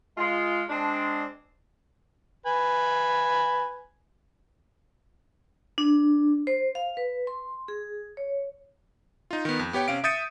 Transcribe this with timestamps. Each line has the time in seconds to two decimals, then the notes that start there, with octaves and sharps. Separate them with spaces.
0.17 G#3 F4
0.69 G#3 C4 D4
2.46 B4 G#5 B5
5.78 D4
6.47 C5
6.75 F5
6.97 B4
7.27 C6
7.68 G#4
8.17 C#5
9.31 D#4 F4
9.45 D#3 B3
9.59 F2
9.73 B3 G4 C#5 G5
9.88 C3 C#4 F5 D7
10.04 E5 D#6 G6 A6 C#7 D#7